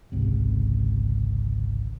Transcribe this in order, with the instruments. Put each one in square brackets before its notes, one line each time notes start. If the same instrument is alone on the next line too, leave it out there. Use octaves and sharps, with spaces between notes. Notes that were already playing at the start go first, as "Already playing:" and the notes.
[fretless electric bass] G#1 C#2 C3